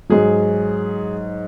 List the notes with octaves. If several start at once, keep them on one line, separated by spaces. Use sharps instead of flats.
G#2 F#3 G#4